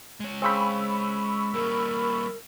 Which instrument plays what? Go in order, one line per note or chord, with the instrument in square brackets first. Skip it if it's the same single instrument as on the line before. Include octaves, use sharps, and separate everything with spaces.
[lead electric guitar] G#3 C#5
[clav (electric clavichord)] C#3 C4 [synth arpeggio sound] B5 C#6 E6
[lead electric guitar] G3 A#3 [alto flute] A#4